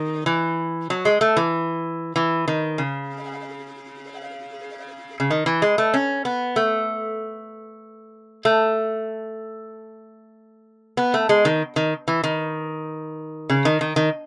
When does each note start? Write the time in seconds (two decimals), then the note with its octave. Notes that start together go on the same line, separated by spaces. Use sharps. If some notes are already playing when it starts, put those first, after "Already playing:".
Already playing: D#3
0.26 E3
0.90 F#3
1.05 G#3
1.21 A3
1.37 E3
2.16 E3
2.48 D#3
2.78 C#3
5.20 C#3
5.31 D#3
5.46 E3
5.62 G#3
5.78 A3
5.94 C#4
6.25 B3
6.56 A3
8.45 A3
10.97 B3
11.14 A3
11.29 G#3
11.45 D#3
11.76 D#3
12.08 E3
12.24 D#3
13.50 C#3
13.65 D#3
13.81 D#3
13.96 D#3